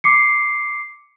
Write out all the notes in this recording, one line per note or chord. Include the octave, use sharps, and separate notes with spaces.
D6 C7 C#7